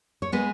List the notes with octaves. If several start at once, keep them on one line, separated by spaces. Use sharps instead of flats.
C#5
G#3 B3 B4